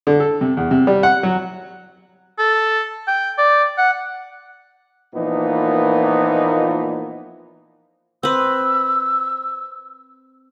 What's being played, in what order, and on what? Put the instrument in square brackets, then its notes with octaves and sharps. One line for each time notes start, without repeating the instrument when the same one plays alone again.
[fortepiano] D3
A4
C3
E2
C3
G3
F#5
F#3
[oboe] A4
G5
D5
F#5
[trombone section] A#2 E3 F3 A#3 B3 D#4
[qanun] C4 B4 [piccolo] E6